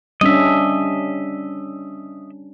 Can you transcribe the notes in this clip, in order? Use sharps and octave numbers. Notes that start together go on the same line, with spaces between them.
G3 C#4 D4 D#5 E5